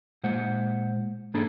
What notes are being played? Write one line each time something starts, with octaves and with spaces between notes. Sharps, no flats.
A#2 G#3 C5 F#5
G#2 A#3 D4 G#4 A4 B5